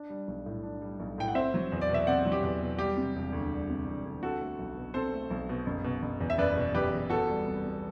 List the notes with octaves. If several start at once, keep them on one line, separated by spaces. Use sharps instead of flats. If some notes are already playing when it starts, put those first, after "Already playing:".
Already playing: D4
G3
B1
A2
D4
G3
B1
A2 G5
F#5
C4 C5 E5
F#3
E2
D5
B2
E5
C4 D5 F#5
F#3
G4
E2
B2
G3 G4
C3
E1
D2
G3
C3
E1
D2
C4 F#4 A4
A3
B1
B2
C4 A4 C5
A3
B1
B2
F#1
B2
F#1
E2
E5
F#1 B4 D5
B2
F#1 G4 B4
E2
B3 F#4 A4
G3
C2
C3